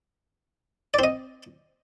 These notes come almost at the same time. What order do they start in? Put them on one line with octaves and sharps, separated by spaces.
D5 C4 D#5